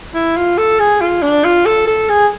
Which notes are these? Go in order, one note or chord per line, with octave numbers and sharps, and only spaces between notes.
E4
F4
A4
G#4
F4
D4
F4
A4
A4
G#4